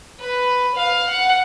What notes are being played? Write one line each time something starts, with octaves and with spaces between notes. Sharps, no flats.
B4
F5
F#5